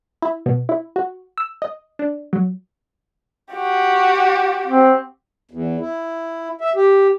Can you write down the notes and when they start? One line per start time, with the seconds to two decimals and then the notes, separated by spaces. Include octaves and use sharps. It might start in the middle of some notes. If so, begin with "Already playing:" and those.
0.22 E4
0.46 B2
0.69 E4
0.96 F#4
1.38 E6
1.62 D#5
1.99 D4
2.33 F#3
3.52 F#4 G4
4.66 C4
5.51 E2
5.80 E4
6.61 E5
6.76 G4